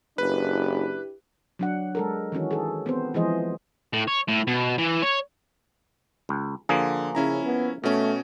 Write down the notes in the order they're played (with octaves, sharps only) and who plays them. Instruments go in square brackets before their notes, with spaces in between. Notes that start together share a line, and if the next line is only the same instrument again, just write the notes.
[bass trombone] F#1 [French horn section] D4 E4 G4 [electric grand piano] B4
[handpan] F#3 D4 F#5
G#3 A4 A#4
D#3 E3 C#4 F#4
G#4 A4
B3 C4 C5
E3 F3 G#3 G#4 C5 D#5
[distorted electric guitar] A2
C#5
A2
B2
E3
C#5
[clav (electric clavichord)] C#2
[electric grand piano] D3 [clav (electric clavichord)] F3 A#3 G#4
[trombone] C#3 [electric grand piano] C#4 E4 A#5
[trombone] B3
[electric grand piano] B2 C#4 [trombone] A3